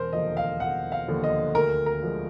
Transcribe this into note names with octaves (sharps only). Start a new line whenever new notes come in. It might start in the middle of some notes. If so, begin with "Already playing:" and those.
Already playing: E1 A#4 C5
D#2 D3 F3 D#5
F5
E1 F#5
F5
D#2 D3 F3
D#5
D2 A#4
A#4
D3 F3 G#3